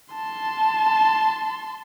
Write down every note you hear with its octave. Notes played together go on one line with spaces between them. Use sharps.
A5 C6